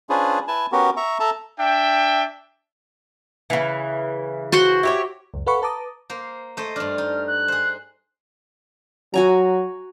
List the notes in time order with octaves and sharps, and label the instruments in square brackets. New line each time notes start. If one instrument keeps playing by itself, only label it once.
[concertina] C#4 D4 F4 G#4 B4 C5
E4 B4 G#5 A5
B3 C#4 F#4 G4 A#4
E5 A#5 C#6
A4 E5 A5 A#5
[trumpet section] D4 E5 G5
[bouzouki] C#3 E3
[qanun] F#4 C5 F#5
[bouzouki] E4 G4 C#5
[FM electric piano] C#2 F#2
A4 B4 F5 F#5 B5 C#6
B4 A5 A#5 D6 D#6
[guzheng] A#3 C5
A3 C5 D#5
[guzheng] G2 D4 [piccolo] F6
[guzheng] D#4
[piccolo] F#6
[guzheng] G#4 C5
[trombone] F#3 [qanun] F#4 G#5 A#5